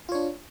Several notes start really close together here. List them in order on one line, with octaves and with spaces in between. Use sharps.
F4 C#5 D4